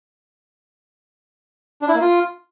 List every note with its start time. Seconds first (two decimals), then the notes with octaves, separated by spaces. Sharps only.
1.82 D4
1.88 E4
1.95 A#3
2.01 F4